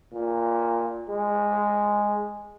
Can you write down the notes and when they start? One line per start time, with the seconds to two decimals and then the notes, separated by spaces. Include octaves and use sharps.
0.13 A#2
1.09 G#3